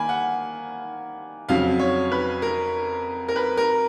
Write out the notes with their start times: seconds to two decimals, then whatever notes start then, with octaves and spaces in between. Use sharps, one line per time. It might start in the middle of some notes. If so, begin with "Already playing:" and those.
Already playing: D#3 A#3 G#5 B5
0.09 F#5
1.49 F2 C#3 F#3 F5
1.79 C#5
2.12 B4
2.42 A#4
3.28 A#4
3.36 B4
3.57 A#4